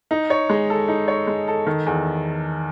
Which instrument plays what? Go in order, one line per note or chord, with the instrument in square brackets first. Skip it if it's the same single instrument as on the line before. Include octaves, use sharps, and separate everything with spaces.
[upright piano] D#4
C#5
G#3
A4
D#4
C#5
G#3
A4
D#3
E2